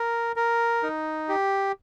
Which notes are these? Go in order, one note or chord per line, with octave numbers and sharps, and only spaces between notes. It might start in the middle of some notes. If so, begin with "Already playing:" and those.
Already playing: A#4
A#4
D#4
G4